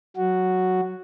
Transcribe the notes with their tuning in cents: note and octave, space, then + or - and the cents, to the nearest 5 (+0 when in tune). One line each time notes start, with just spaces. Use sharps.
F#3 +0 F#4 +0